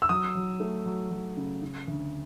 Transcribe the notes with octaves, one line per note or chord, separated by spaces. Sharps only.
E6
F#3 D#6
F#3
A3
F#3
F#3
C#3
C#3
D2